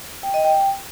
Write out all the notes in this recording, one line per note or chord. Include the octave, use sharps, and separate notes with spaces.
G5
D#5
G5